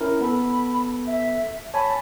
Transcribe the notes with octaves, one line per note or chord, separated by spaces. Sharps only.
C#4 E4 A#4
B3 A4 B5
E5
C#5 G#5 A5 B5